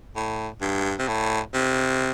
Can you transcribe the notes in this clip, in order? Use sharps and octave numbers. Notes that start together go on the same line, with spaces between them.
A2
G2
C3
A2
C3